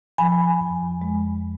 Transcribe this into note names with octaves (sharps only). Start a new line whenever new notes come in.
F3 G#5 B5
F2
G#3